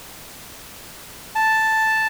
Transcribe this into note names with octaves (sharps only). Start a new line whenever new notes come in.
A5